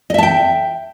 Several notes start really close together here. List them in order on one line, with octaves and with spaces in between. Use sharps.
D#5 E5 A5 G5